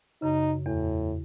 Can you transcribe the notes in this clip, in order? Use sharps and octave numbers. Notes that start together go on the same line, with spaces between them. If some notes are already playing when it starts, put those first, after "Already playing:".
F#2 C#3 D#4
E2 A2